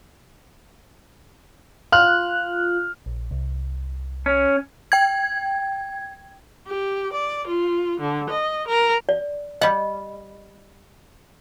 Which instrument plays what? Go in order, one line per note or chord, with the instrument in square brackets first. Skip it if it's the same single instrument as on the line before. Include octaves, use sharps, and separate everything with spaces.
[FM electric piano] F4 F#6 [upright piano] F6
[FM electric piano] A#1
C2
[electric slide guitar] C#4
[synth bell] G5 G#6
[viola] G4
D5
F4
D3
D#5
A#4
[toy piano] D5
[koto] G3 F#5 [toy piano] D#5